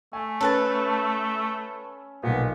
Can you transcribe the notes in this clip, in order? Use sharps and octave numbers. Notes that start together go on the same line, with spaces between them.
A3 G#5
C#4 A4 B4 A5
B1 A#2 B3